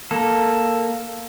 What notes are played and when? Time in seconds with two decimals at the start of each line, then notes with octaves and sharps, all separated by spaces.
0.11 A#3 A4